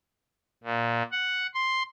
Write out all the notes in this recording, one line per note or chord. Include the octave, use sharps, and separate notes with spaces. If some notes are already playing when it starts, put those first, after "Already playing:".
A#2
F#5
C6